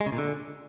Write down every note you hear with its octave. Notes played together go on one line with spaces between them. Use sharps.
G#3
C#3
A#2
D3